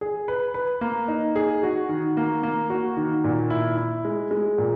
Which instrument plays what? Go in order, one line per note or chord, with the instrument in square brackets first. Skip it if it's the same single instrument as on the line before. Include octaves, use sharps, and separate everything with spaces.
[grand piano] G#4
B4
B4
A#3
D#4
G#4
F#4
D#3
A#3
A#3
F#4
D#3
A#2
E4
E4
G#3
G#3
A#2